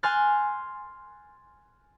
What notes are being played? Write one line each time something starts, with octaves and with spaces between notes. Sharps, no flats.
G#5 C6 F6 F#6 A6